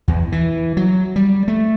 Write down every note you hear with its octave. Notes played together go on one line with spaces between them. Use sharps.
E2
E3
F#3
G3
A3